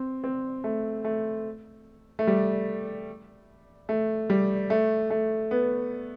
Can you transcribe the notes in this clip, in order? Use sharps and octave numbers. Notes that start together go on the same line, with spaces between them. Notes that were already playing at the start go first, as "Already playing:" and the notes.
Already playing: C4
C4
A3
A3
A3
G3
A3
G3
A3
A3
B3